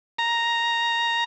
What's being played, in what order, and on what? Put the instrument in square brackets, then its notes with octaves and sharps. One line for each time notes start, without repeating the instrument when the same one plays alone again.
[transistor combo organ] A#5